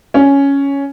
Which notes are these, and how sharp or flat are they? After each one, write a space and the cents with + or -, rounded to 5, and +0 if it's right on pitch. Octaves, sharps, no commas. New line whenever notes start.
C#4 +5